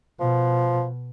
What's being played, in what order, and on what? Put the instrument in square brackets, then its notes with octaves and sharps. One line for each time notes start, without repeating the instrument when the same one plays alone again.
[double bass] B2 [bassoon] F3